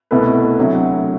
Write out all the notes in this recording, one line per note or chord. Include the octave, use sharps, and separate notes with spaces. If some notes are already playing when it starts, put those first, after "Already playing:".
C2 B2 A3 E4 B4
D2 C3 F#3